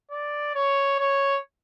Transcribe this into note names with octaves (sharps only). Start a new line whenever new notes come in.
D5
C#5
C#5